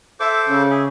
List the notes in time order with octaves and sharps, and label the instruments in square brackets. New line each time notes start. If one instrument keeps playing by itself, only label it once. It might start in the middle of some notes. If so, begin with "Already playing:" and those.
[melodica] A4 C5 D6 [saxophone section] E5
[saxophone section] C#3
[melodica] G#4 E5